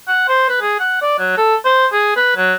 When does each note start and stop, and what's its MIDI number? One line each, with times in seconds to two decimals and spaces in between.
0.08 0.28 78
0.29 0.48 72
0.49 0.60 71
0.61 0.78 68
0.80 1.00 78
1.02 1.16 74
1.19 1.33 54
1.37 1.55 69
1.65 1.87 72
1.92 2.13 68
2.16 2.35 71
2.37 2.54 54